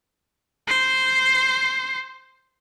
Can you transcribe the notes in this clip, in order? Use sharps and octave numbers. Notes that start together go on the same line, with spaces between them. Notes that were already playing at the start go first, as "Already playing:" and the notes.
C5 C7